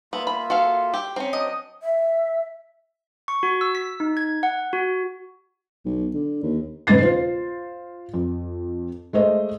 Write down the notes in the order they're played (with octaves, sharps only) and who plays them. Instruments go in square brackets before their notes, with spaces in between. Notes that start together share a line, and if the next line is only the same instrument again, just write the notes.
[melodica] A#3 F4 E5 [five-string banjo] B3
[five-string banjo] B5
[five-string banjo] F#4 A4 F5 [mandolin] C6
[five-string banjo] G4
[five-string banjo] C4 C#4 [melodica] D#4
[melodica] F#3 D4 G5 [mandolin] D#5
[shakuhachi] E5
[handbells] C#6
F#4
E6
B6
D#4
G#6
F#5
F#4
[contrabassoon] B1
D3
D#2
[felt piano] E1 G#2 C#3 B4 A6 C7
F4 C5
F2
G#3 A3 C5 D#5